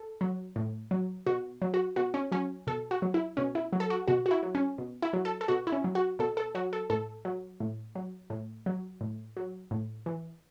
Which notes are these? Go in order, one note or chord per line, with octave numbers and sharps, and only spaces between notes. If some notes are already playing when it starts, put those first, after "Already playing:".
Already playing: A4
F#3
A2
F#3
B2 F#4
F#3
F#4
B2 F#4
C#4
F#3 C#4
B2 A4
F#4
F#3
E4
B2 C#4
E4
F#3
A4
F#4
B2 F#4
F#4
E4
F#3
C#4
B2
E4
F#3
A4
A4
B2 F#4
E4
C#4
F#3
F#4
B2 A4
A4
F#3 F#4
A4
A2 A4
F#3
A2
F#3
A2
F#3
A2
F#3
A2
E3